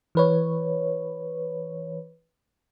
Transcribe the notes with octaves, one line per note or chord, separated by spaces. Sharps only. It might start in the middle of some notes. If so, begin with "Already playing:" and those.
E3 B4 C#5